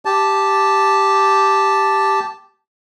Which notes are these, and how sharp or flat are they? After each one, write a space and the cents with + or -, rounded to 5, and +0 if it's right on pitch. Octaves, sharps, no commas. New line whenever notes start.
G4 +0 A5 -5